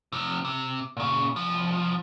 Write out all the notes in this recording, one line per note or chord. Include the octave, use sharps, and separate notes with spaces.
C3 F3
C3
A#2 C#3
C2 F3